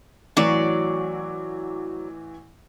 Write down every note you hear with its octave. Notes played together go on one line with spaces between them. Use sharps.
A1 E3 F#3 D5